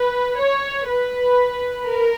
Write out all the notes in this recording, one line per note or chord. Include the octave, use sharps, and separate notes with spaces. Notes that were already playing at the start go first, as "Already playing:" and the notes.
Already playing: B4
C#5
B4
A#4